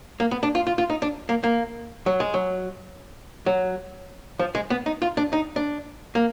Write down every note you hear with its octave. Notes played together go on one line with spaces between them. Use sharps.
A#3
B3
D4
F4
F4
F4
D#4
D4
A#3
A#3
F#3
G#3
F#3
F#3
F3
G#3
B3
D#4
F4
D4
D#4
D4
A#3